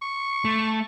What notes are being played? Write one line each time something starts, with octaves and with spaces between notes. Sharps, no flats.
C#6
A3